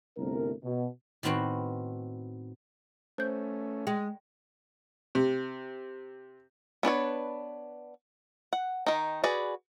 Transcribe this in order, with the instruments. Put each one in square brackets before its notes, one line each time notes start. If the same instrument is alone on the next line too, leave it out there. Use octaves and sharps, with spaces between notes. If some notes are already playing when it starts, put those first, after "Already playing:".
[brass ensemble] G1 C2 A3 C4 A#4
B2
[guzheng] A2 D#3 B3 C4 F#4
[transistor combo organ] A3 C#4 [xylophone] C5 G6
[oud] G#3 [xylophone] G5
[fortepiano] C3
[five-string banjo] B3 D4 B4 C#5
F#5
D#3 D#4
F#4 G#4 B4 D5